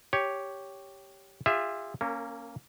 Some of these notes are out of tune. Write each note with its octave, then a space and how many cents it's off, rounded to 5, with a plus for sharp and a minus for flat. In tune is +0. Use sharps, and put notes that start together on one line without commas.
G4 +0 C#5 +5
F4 +0 G#4 -40 E5 +0
A#3 -5 C#4 +0 A#4 -35